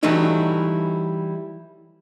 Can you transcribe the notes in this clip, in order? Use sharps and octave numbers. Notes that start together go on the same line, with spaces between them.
E3 F#3 G3 A3 D#4 E4